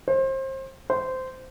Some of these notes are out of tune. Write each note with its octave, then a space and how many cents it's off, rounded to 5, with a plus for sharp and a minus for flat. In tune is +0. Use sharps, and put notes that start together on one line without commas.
C5 +30
C5 -15